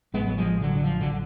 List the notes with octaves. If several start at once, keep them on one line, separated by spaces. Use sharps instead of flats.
A1 A2 G#3 B3
F#3
F3 G#3
D3 F#3
D3
F3
D3 F#3